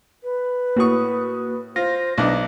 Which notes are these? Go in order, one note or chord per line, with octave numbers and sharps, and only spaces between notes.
B4
A2 A#3 F#4 C#6 D#6
F4 C5 A#6
B1 D4 D#5 D6